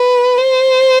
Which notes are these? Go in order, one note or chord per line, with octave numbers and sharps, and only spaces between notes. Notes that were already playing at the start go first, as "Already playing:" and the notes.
Already playing: B4
C5